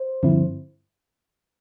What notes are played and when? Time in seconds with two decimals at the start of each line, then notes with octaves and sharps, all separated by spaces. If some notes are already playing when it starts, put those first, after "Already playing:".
Already playing: C5
0.23 G2 D3 F3 C4 E4